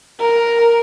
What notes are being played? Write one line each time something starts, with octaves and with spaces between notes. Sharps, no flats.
A#4